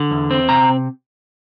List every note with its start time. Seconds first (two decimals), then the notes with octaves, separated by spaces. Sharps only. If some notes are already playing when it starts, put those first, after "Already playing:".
Already playing: D3
0.11 E2
0.31 C4
0.49 C3 A#5